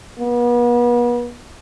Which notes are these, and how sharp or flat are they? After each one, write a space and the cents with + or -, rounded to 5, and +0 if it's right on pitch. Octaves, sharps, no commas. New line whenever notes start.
B3 -40